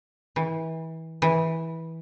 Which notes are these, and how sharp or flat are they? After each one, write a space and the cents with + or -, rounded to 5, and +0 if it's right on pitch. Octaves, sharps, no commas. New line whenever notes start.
E3 -30
E3 -15